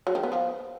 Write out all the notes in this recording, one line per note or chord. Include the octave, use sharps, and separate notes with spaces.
F#3
D#3
B3
F3